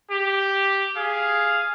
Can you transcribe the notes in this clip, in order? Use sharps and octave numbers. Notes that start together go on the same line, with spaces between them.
G4
G#4 F5